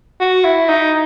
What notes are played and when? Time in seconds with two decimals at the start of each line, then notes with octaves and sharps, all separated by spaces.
0.20 F#4
0.44 E4
0.69 D#4